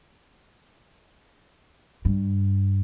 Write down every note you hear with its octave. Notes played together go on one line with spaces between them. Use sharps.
G2